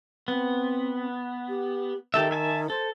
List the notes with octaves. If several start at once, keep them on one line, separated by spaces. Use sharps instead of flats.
B3 C4
G4
D#3 G4 A4 E5
E5 G#5 A5
A4 C5